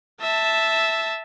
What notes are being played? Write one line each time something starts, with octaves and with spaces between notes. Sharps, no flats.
E5 A5